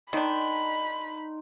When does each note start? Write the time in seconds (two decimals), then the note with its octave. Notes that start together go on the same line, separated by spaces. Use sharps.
0.13 D#3 D4 D#4 C5 B5 D#6